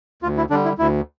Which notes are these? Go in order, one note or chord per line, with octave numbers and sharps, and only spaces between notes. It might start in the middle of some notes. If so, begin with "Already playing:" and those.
D2 F4
E4
D3 G3 D4
E4
D2 E4